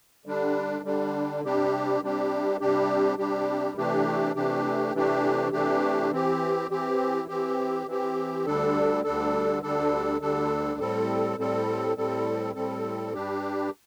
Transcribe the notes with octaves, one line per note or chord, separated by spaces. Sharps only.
D3 G3 D4
D3 G3 D4
C3 G3 D4 G4
C3 G3 D4 G4
C3 G3 D4 G4
C3 G3 D4 G4
C3 E3 A3 D4 G4
C3 E3 A3 D4 G4
C3 E3 A3 D4 G4
C3 E3 A3 D4 G4
E3 C4 G4
E3 C4 G4
E3 C4 G4
E3 C4 G4
D2 D3 G3 D4 A4
D2 D3 G3 D4 A4
D2 D3 G3 D4 A4
D2 D3 G3 D4 A4
A2 G3 C4 A4
A2 G3 C4 A4
A2 G3 C4 A4
A2 G3 C4 A4
G2 G3 D4 G4